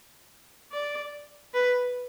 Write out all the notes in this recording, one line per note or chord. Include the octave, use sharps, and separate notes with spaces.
D5
B4